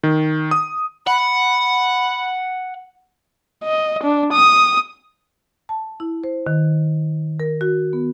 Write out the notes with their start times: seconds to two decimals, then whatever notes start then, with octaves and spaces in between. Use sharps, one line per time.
0.03 D#3
0.51 D#6
1.07 F#5 B5
3.64 D#5
4.03 D4
4.32 D#6
5.69 A5
6.00 E4
6.24 C5
6.47 D#3
7.40 A#4
7.61 F#4
7.93 B3